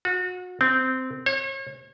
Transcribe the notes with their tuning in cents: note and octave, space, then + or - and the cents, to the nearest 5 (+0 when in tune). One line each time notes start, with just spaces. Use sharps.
F#4 -30
C4 -15
C#5 -40